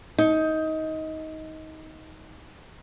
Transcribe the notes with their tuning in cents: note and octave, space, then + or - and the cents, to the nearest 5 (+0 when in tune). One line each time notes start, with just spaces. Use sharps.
D#4 +20